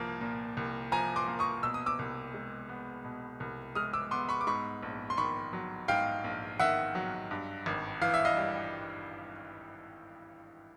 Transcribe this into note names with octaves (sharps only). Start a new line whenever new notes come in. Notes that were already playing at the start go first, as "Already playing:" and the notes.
Already playing: C2 A#2 F3 A#3
A#2
C2
F3 G#5 A#5
C6 D6
A#3
C#6 D#6
B2 E6
D#6
D6 E6
C2
G#3
B3
B2
C2
G#3 D#6 F6
D6 E6
B3 C6 D6
B5 C#6
D6
G#2 B5 C#6
A#1
C6
D#3 B5 C#6
F#3
G#2 F5 G5
A#1
D#3 E5 F#5
F#3
G2
G#1
E3 F5
E5
D#5 F5
G3